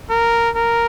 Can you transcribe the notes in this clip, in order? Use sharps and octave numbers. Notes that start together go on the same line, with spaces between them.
A#4
A#4